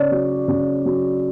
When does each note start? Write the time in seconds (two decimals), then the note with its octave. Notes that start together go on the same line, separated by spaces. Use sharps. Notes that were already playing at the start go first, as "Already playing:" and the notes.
Already playing: C#3 C#5 D5
0.11 F#3
0.48 C#3
0.85 F#3